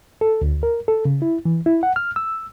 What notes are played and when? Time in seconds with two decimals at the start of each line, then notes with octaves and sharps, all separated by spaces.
0.21 A4
0.42 D2
0.63 A#4
0.88 A4
1.05 C#3
1.22 E4
1.45 E3
1.66 E4
1.83 F#5
1.96 F6
2.16 E6